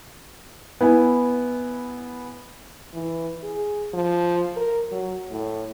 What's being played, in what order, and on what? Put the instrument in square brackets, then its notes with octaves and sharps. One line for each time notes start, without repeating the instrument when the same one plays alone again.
[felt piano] B3 E4 G#5
[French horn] E3
G#4
F3
A#4
F#3
A2